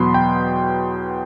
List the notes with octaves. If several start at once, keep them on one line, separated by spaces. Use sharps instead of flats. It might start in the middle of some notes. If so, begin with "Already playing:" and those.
Already playing: E2 B2 F#3 B3 B5 C6
G5